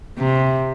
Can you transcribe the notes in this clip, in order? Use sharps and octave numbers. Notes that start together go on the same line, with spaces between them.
C3